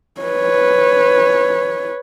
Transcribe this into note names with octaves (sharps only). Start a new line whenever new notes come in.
B4 C#5